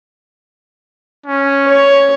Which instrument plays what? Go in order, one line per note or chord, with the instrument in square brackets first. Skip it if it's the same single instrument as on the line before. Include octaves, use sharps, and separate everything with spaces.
[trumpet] C#4
[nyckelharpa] C#5